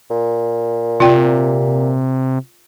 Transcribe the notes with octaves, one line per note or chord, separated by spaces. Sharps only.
A#2
C3 F4 D5 G5